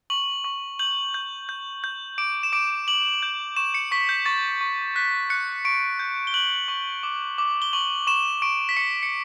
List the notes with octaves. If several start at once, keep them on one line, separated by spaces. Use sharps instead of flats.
C#6 F#7
C#6
G6 F#7
G6
G6
G6
D6 D7
E7
D6 D7
D6 F#7
G6
C#6 E7
C#7
C#6 B6
G6
C#6 A6
C#6
F#6 B6
F#6 C#7
C#6 D7
G6
G7
F#6 F#7
C#6
D6
D6
G7
C#6 F#7
C#6 E7
C#6 D7
B6
C#6 C#7
C#7